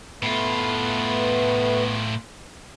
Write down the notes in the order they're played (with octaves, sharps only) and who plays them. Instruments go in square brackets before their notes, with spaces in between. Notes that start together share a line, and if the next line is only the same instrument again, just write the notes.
[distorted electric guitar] A2 F4 [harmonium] A3 B4 [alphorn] B3